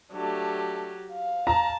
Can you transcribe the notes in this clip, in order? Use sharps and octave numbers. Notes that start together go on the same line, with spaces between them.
F#3 A3 D4 G4
F5
A5 A#5